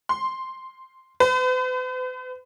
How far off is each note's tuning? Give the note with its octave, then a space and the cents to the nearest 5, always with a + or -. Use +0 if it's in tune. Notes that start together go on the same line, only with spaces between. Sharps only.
C6 +0
B4 +45